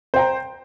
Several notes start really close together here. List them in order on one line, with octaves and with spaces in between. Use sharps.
C5 G5 A#5